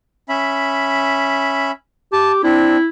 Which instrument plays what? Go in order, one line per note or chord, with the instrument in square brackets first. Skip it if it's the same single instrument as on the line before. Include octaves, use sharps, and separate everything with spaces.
[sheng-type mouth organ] C#4 E5 B5
[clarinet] G4 [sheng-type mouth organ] A5
[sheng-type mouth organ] C4 D4 [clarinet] E4